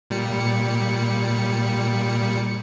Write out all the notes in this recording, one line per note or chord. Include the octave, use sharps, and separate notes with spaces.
A#2 G3 C#7